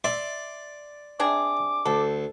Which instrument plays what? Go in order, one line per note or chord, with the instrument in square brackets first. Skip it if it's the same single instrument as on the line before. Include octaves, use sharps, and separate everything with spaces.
[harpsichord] D5 C6 [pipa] E5
[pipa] C3 D4 G#4 [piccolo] D6
[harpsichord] D2 [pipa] A4